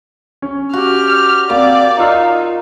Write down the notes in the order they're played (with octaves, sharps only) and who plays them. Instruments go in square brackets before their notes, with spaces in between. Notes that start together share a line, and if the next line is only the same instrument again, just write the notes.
[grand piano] C#4
[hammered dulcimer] F#4 [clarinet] G4 [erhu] F6
[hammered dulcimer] A#3 [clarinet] C4 [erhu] D5 [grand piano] D6
[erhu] D#4 [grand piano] F4 E6 [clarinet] F5